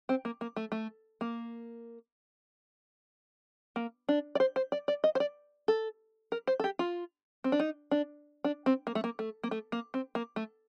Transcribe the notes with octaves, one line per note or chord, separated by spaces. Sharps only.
C4
A#3
A#3
A3
A3
A#3
A#3
D4
D5
C5
C5
D5
D5
D#5
C5
D5
A4
A#4
C5
A4
G4
F4
C4
D4
D#4
D4
D4
C4
A#3
A3
A#3
A3
A#3
A3
A#3
C4
A#3
A3